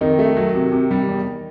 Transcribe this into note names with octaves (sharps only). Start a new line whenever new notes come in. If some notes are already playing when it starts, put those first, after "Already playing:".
F2 D#3 D#4
A3
F#3
C3
C3
G3
E2